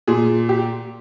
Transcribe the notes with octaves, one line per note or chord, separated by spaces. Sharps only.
A#2 G#4
G4